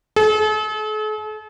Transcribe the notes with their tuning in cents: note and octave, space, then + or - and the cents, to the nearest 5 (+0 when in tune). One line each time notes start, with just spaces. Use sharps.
A4 -45